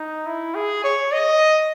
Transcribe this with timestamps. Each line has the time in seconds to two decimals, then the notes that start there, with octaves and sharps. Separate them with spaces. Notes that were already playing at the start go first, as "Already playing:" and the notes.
Already playing: D#4
0.26 E4
0.55 G#4
0.84 C#5
1.12 D#5